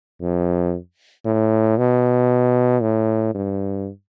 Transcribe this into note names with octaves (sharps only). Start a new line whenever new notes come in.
F2
A2
B2
A2
G2